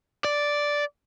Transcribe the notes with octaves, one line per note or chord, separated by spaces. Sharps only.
D5